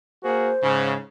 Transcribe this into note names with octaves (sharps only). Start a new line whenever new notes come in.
A#3 F#4 G#4 C5
G#2 C#3